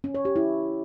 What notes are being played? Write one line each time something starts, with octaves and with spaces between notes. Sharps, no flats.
C#4
C#5
G4
E4